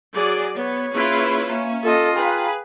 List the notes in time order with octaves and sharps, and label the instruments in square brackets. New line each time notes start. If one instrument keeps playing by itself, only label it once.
[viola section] F#3 G#4 D5
[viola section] B3 [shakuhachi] C#5
[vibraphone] A#3 C#4 G#4 [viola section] E4 F4 B4
[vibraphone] A#3 E5 F5 [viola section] C#4
[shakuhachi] F4 [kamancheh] A4 D#5
[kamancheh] G#4 [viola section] B4 [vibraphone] F5 G5 A#5